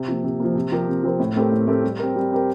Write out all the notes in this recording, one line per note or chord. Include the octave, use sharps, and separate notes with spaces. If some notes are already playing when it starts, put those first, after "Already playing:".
Already playing: C3
F3 A#3
C3
F3 A#3
C3
F3 C4 G4 A#4
C3
F3 C4 G4 A#4
A2
A3 C4 G4 A#4
A2
A3 C4 G4 A#4
G3
C4 G4 A#4
G3
C4 G4 A#4